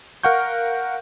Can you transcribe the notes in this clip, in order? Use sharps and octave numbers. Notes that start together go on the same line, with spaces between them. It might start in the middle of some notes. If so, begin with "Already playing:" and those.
A#4 F5 F#5 C#6 G6